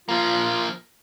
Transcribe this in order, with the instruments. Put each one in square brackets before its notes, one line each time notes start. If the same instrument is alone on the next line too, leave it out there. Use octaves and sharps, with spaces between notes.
[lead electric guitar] F3 A#3 [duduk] F4